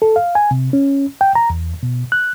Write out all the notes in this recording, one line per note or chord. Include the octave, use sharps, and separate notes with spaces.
A4
F5
G#5
C3
C#4
G5
A#5
E2
B2
F#6